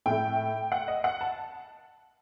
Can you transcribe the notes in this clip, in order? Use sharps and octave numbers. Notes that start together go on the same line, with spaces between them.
A2 A3 G5
F#5
D#5
F#5
A5